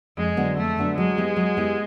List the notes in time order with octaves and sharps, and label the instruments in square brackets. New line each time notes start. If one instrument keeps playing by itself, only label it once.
[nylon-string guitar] F2 [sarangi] G#3
[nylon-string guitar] D3 F#3 B3 D4
[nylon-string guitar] F2 [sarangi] A3
[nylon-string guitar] D3 F#3 B3 D4
[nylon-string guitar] F#3 [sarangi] G#3
[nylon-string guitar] B3 E4 G4
F#3
B3 E4 G4